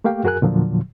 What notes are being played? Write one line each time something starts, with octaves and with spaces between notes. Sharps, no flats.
A3 A#3 G4 F5 G5
F#2 F#4 G#4 A#4 G#5 F#6
E2 A#2 D3 F3 F#3